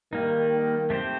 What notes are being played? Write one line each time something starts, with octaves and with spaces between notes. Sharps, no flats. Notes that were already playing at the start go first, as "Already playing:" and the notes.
D#3 G3 A#3 D#4
A3 C4 G4 C5